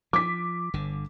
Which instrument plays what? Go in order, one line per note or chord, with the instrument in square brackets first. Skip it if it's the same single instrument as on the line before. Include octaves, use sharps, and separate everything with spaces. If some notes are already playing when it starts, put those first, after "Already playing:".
[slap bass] F3 [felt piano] D6 B6
[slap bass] G1 D3